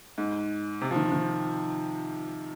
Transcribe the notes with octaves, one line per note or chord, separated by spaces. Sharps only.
G#2
C3
F3
D#3
D#3